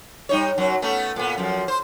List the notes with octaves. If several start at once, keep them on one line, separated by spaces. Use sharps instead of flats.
G3 D#4 C#5
F#2 F#3
A3 B3 C#4
A#2 B3
F#2 F3
C5